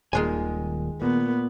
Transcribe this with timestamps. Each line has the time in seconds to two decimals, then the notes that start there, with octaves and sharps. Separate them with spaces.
0.13 D#1 A#2 D#3 G#3 G#5
1.02 A#2 B3